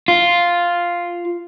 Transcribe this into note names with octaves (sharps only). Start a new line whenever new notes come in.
F4